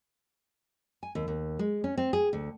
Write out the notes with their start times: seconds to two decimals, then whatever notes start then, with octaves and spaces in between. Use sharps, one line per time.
1.03 G#5
1.15 D#2
1.28 D#2
1.59 G#3
1.84 C#4
1.98 C4
2.13 G#4
2.33 D2